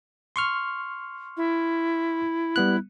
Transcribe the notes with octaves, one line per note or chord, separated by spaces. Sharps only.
C6 C#6 F6
E4
G3 B3 F#6